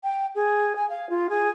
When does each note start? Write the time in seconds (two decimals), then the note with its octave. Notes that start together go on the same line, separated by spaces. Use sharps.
0.03 G5
0.35 G#4
0.75 G#5
0.89 F5
1.09 F4
1.29 G#4